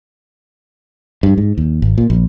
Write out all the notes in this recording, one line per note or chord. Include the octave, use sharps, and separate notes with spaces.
G2
G#2
D#2
G#1
A#2
A#1